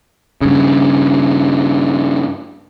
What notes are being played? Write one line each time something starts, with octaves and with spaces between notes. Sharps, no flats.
G2 C#3